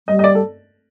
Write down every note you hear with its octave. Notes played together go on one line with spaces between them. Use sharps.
G3 D#5
D#5
D5
A4